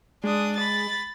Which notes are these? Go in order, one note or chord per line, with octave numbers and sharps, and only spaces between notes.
G#3 D4 D#6
B5 A6